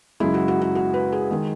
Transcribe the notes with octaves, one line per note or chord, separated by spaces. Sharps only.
F#2 C#3 G#3 E4
F#4
F#4
F#4
F#4
B4
G#4
D#3 G#3